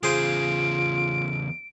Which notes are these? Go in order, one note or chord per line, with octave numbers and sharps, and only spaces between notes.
E2 C#3 F4 G#4 C5 D7